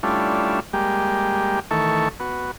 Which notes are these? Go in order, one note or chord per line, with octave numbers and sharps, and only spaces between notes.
G3 A3 C#4 D4 E4 F4
G3 G#3 A#3 G4
D#3 E3 A3 A4 C#6
B3 F#4